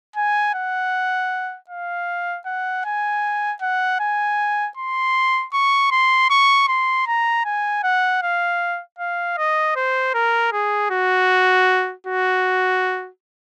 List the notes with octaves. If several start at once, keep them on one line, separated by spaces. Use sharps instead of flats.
G#5
F#5
F5
F#5
G#5
F#5
G#5
C6
C#6
C6
C#6
C6
A#5
G#5
F#5
F5
F5
D#5
C5
A#4
G#4
F#4
F#4